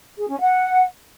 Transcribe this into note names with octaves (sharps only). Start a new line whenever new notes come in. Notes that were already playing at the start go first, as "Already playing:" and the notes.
G#4
C#4
F#5